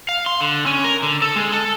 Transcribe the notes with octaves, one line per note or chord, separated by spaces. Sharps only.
F5
C6
D3
C#4
A#4
D3
A4
G#3
A4